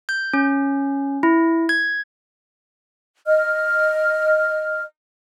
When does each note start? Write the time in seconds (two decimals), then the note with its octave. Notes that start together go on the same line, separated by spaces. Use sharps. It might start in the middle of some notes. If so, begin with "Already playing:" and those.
0.09 G6
0.33 C#4
1.23 E4
1.69 G#6
3.27 D#5 F6